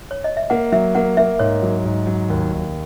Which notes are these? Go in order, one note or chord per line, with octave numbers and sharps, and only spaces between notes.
C#5
D#5
E5
A#3 F#5
F#3 E5
A#3 F#5
A#3 E5
G#2 C#5
F#3
G#2
F#3
D#2
D#2